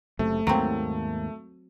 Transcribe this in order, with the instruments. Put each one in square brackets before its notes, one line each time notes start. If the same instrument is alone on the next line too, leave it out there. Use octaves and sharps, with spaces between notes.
[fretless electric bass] F#1 F#2 C3 [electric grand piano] A3
[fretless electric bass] D#2 G#2 A#3 [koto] F#3 C4